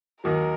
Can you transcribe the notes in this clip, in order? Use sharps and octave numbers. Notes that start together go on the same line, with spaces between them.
D#2 D#3 F#3 A#4